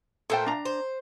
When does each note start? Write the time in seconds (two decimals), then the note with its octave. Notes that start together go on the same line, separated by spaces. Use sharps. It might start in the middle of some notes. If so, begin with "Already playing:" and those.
0.30 A#2 A3 A4 C5 G5
0.46 D4 A#5
0.65 C5